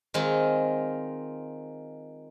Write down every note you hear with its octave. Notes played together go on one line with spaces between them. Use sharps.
D#3 G#3 C4 F4